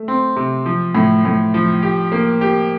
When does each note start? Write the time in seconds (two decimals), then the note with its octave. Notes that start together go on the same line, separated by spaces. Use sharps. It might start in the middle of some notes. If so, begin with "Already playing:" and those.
Already playing: A3
0.08 C4
0.36 C3
0.66 F3
0.95 A2
1.25 A2
1.54 F3
1.82 G4
2.12 A#3
2.41 G4